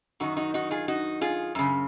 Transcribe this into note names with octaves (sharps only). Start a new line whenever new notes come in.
F#2 D#3 D#4 F#4
D#4 F#4
D#4 F#4
F4 G#4
D#4 F#4
F4 G#4
F#2 C#3